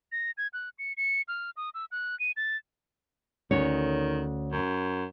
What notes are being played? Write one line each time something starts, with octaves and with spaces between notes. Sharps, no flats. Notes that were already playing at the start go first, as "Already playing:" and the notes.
A#6
G#6
F#6
C#7
C#7
F6
D#6
E6
F#6
D#7
A6
D2 D#3 C#4 C#5
F#2